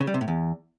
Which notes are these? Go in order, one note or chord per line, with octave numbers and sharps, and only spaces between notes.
C#3
G3
C3
A2
E2